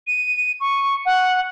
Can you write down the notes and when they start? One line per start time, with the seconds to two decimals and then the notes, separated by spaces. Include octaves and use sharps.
0.07 D#7
0.60 C#6
1.06 F#5